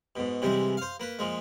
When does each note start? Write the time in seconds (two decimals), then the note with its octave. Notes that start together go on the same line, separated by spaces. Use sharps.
0.16 G#2 B2
0.42 C3 E3 G3 G#3
0.77 C5 F5
1.00 A#3 B4
1.19 A#2 F3 G#3